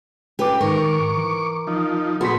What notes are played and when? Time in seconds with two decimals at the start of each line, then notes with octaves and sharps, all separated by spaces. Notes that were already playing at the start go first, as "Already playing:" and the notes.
0.39 C#4 G4 B4 D6
0.61 G#2 D#3 A#4 C#6 D6
1.17 E3
1.67 F3 D#4
2.21 A#2 A3 B3 F#4 G#4 C6 B6